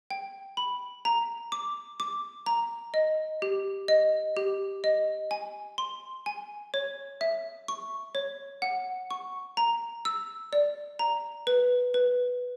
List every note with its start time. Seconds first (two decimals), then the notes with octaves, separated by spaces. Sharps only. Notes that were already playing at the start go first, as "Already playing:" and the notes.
0.11 G5
0.57 B5
1.05 A#5
1.52 D6
2.00 D6
2.46 A#5
2.94 D#5
3.42 G4
3.88 D#5
4.37 G4
4.84 D#5
5.31 G#5
5.78 C6
6.26 G#5
6.74 C#5
7.21 E5
7.68 C#6
8.15 C#5
8.62 F#5
9.11 C#6
9.57 A#5
10.05 E6
10.53 D5
10.99 A#5
11.47 B4
11.94 B4